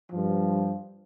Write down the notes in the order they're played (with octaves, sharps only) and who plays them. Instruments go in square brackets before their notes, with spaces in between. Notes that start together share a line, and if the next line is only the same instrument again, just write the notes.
[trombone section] G2 F3